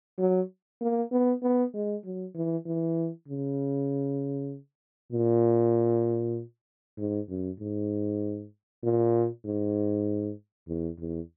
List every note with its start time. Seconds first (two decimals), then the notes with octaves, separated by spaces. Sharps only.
0.19 F#3
0.82 A#3
1.11 B3
1.42 B3
1.74 G#3
2.05 F#3
2.35 E3
2.66 E3
3.28 C#3
5.12 A#2
6.98 G#2
7.29 F#2
7.60 G#2
8.84 A#2
9.45 G#2
10.68 E2
10.98 E2